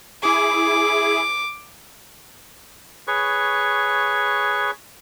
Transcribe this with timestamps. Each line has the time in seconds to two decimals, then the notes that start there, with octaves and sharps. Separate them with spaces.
0.23 E4 G#4 D6
3.07 G#4 B4 C#5 C#6